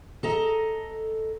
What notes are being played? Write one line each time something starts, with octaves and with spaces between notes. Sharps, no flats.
A4 D#5 A#5